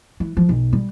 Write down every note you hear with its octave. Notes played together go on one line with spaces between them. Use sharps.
E3
F3
B1
G3